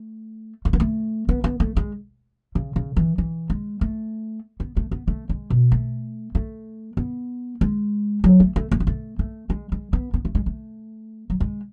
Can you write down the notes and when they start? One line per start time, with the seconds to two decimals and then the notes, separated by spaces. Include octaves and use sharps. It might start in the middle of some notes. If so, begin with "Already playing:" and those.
Already playing: A3
0.65 A3
0.73 B3
0.80 A3
1.29 B3
1.44 B3
1.60 A3
1.77 G#3
2.55 C#3
2.76 C#3
2.96 E3
3.18 E3
3.50 G#3
3.81 A3
4.60 B3
4.77 A3
4.91 B3
5.08 A3
5.29 G#3
5.50 B2
5.72 A3
6.35 A3
6.97 B3
7.61 G#3
8.24 F#3
8.40 A3
8.56 A3
8.71 A3
8.80 B3
8.87 A3
9.19 A3
9.50 G#3
9.72 G#3
9.93 B3
10.14 B3
10.25 A3
10.35 G#3
10.46 A3
11.30 F#3
11.40 G#3